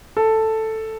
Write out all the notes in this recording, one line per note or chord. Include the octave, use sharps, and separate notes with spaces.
A4